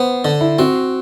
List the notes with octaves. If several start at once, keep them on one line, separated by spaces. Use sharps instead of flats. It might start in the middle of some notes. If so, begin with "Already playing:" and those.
Already playing: B3 C5
D3
E4
C4 F#4